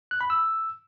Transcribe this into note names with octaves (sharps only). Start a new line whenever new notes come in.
F#6
B5
E6